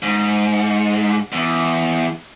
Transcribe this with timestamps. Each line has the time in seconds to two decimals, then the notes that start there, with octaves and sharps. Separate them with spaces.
0.03 G#2
1.32 E2